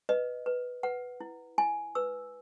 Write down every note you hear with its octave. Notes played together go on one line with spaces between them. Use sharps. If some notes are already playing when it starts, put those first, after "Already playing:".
B4 D#5
B4
B4 F#5
E4
E4 G#5
B4 E6